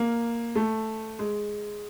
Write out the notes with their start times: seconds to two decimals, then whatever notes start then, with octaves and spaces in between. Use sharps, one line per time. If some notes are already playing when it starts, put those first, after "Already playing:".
Already playing: A#3
0.55 A3
1.19 G#3